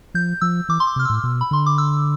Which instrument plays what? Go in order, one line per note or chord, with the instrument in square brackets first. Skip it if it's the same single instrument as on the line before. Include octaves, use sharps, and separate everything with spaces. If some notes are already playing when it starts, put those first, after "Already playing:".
[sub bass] F3 [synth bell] G6
[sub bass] F3 [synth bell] E6
[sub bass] E3 [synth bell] D6
[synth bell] C6
D6
[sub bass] C3 [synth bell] F6
[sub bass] A2 [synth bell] E6
[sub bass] B2
[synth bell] B5
[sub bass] D3 [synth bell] C6
[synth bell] D6
E6